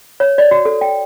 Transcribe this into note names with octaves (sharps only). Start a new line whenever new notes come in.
C#5
D5
F#4
A4
G5